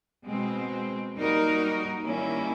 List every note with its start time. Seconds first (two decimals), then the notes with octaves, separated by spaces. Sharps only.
0.25 B2 G#3 C4
1.15 G3 A#3 D#4 F#4 A#4
2.05 D#3 G3 A#3 C#4 E4